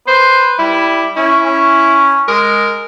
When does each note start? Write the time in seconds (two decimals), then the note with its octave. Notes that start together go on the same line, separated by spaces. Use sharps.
0.08 B4 C5
0.59 G3 E4
1.17 C#4 E4
1.45 C#4
2.28 G#3 A#4